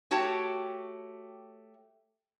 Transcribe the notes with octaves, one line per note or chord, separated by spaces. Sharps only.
A3 F#4 G4 C#5 A5